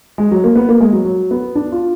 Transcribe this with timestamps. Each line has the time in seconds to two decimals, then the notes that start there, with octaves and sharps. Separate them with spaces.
0.18 G#3
0.32 F#3
0.44 A#3
0.56 B3
0.69 A#3
0.80 G#3
0.93 F#3
1.05 F#3
1.31 B3
1.56 D4
1.72 F4